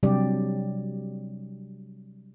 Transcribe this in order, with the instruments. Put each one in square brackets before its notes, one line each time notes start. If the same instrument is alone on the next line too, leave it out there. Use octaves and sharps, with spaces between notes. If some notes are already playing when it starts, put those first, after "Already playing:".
[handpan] C3 F#3 G3 D4 G4 D5